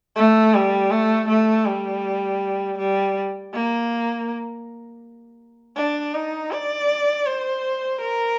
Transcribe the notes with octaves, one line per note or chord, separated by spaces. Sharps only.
A3
G3
A3
A3
G3
G3
A#3
D4
D#4
D5
C5
A#4